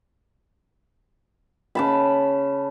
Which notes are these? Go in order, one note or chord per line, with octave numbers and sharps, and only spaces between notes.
C#3 A5 B5